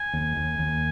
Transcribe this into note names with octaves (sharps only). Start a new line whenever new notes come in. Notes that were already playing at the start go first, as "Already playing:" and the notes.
Already playing: G#5
D#2
D#2
D#2